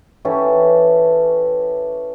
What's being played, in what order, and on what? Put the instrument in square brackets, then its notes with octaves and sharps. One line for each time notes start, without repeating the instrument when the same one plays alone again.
[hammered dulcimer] E3 C#4 G4 A4